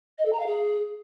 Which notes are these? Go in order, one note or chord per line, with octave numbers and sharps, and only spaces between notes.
D#5
A4
A#5
F5
G#4